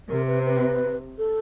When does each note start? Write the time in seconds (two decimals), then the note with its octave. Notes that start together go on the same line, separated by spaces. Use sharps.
0.09 C3 A#4
0.27 B4
0.45 B4
1.18 A4